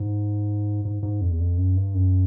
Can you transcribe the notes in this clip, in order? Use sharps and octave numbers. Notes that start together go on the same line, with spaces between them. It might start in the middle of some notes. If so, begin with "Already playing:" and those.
Already playing: G#2
G#2
G#2
F2
E2
F2
F#2
G2
F#2